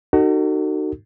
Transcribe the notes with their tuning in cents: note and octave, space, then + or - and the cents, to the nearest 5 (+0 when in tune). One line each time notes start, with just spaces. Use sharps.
D#4 -25 F#4 +25 A4 +40